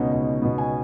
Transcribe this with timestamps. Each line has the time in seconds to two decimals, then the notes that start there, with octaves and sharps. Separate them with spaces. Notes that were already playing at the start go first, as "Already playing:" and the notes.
Already playing: C#2 B2 B3 C#4 D#4 F#4
0.12 C#2 D#4
0.42 B2 B3
0.58 G#5